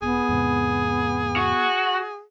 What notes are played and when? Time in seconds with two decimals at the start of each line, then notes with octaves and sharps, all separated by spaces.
0.02 E1 B3 G#4
0.29 E2 G#2 C3
1.36 F#4